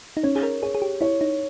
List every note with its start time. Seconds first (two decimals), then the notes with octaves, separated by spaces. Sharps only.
0.17 D#4
0.23 C#4 C#5
0.36 G#4
0.43 A#4
0.63 G#4 C#5
0.75 G#4
0.82 G4
1.01 E4 C#5
1.21 D#4